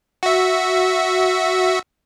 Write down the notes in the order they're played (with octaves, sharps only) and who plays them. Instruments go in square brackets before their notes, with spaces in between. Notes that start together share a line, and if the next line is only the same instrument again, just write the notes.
[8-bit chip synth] F#4 E5